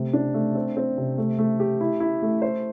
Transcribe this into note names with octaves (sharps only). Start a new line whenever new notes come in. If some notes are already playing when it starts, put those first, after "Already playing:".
Already playing: C3 A3
D4
A3
C4
C4
C3
A3
A3
G4
E4
E4
A3
C5